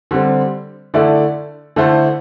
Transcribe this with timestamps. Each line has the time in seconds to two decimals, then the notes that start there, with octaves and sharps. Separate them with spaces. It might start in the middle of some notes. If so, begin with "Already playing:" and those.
0.11 D3 G3 C4
0.94 D3 A3 E4 A4 D5
1.76 D3 A3 E4 A4 C5